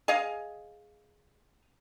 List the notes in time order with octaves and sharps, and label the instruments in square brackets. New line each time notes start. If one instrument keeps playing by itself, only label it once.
[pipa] G#4 D#5 F5